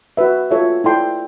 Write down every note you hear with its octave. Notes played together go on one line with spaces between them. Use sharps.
F#4 B4 E5
F4 A4 C#5 E5
E4 A4 D5 G5 C6